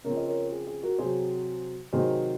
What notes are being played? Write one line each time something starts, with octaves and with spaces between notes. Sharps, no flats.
C#3 F3 C4 A#4 C#5
D#5
A#4 C#5
G#4
G#4
F#4 A#4
C3 F#3 C4 G#4 C5
C3 D#3 F#3 G#4 C5